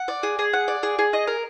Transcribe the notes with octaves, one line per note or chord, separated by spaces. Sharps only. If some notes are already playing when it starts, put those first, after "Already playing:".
Already playing: F#5
D5
G#4
G#4
F#5
D5
G#4
G#4
D#5
A#4